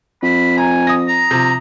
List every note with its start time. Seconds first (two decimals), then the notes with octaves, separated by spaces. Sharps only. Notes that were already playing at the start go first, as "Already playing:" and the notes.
0.23 F2 B5
0.58 G#5 A#5
0.87 D#6 A#6
1.08 A#5
1.31 C3 F3